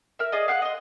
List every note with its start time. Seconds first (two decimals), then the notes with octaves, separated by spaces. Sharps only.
0.19 A#4 E5
0.32 G#4 D5 D#5
0.48 F5 F#5 D6 F#6
0.62 D#5 C6